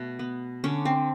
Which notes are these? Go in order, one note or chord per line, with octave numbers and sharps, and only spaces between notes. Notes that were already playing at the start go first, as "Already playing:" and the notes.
Already playing: B2 A3
B3
D3 C#4
C4